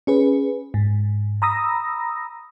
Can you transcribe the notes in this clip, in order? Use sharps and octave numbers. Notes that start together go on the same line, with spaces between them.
C#4 G#4 B4
G#2
A#5 B5 D#6 E6 A#6